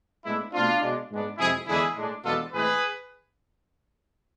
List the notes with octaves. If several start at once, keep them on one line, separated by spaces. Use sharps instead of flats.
A2 G#3 B3 D4 E4
B2 A3 C4 D4 F4
B2 G#3 D4
G#2 G#3 B3 D4
F2 C3 G#3 E4 G#4
E2 D3 G#3 D4 E4 G#4
A2 G#3 D4
E2 B2 G#3 B3 D4 F4 A4
A2 E3 G#3 C4 G#4 B4